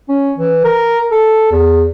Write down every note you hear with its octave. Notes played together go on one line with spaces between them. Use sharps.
C#4
E3
A#4
A4
E2